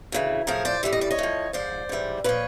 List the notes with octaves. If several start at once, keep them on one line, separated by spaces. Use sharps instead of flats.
D2 C#3 E3
A2 F3 G#4 A#4
C5 D5
A2 E3 G3 E5
D#5
D5
C#5 D#5
A2 F3
G#2 F3 C5 D5
G#2 E3 G3
A#2 F3 B4 C#5